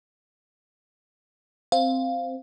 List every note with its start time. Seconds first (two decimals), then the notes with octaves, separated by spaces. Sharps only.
1.72 C4 F5